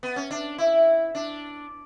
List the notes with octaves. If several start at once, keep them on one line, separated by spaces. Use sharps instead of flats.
B3
C#4
D4
E4
D4